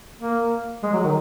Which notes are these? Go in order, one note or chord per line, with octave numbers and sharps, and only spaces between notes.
A#3
G#3
F#3
D#3